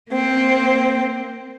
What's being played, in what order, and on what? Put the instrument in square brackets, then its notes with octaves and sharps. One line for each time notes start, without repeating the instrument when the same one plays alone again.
[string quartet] A#3 C4